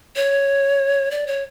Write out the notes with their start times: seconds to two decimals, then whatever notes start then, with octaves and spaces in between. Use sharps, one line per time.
0.16 C#5
1.11 D5
1.27 C#5